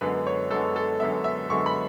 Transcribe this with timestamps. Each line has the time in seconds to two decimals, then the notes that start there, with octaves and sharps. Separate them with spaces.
0.01 F#2 D3 G#3 B3 B4
0.27 C#5
0.51 F#2 D3 G#3 B3 A4
0.76 A4
1.00 F#2 D3 G#3 B3 E5
1.24 E5
1.49 F#2 D3 G#3 B3 C#6
1.66 B5